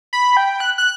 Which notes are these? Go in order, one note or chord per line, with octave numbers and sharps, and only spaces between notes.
B5
G5
F#6
F#6